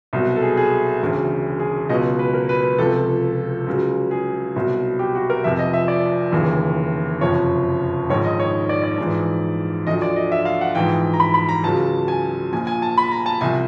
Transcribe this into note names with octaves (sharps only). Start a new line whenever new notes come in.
C2 B2 F#3
A4
G#4
G#4
E1 D2 C#3
G#4
C#2 B2 F#3 D#5
B4
A#4
B4
B4
C#2 C3 F3 A4
C#2 C#3 F#3
G#4
C2 B2 F#3
G4
F#4
A#4
F1 F2 C3 F3 E5
D#5
E5
D5
F1 D#2 C#3 E3
F#1 F2 C3 F3 C#5
A#1 G#2 D#3 C#5
D#5
C#5
D5
D5
A#1 G#2 E3
D2 D3 F3 D#5
D5
D#5
E5
F5
F#5
A#1 G#2 E3 G5
A#5
B5
B5
A#5
C#2 C#3 F#3 A5
G#5
A#1 A#2 F3 G#5
G#5
A5
B5
A#5
A5
C2 C3 F3 G#5